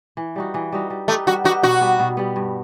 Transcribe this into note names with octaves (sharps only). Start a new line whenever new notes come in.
E3
G3 D#4 F#4
E3
G3 D#4 F#4
G3
A3 D#4 G4 B4
G3 F#4
D#4 F#4 G4 B4
B2 F#4
G3 B3
B2
G3 B3
G2